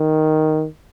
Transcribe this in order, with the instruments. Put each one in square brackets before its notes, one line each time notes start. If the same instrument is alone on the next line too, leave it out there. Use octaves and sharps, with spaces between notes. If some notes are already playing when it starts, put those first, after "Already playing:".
Already playing: [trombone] D#3